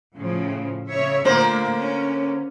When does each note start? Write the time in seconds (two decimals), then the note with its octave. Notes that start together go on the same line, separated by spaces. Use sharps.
0.14 A2 C#3 F3
0.90 C#3 C#5 E5
1.25 A#2 D3 A3 A#3 C5
1.79 C#4